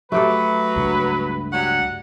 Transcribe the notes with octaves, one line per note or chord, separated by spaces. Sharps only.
F#3 A3 G4 A4 B4
C#2 G2
F#3 G3 F#5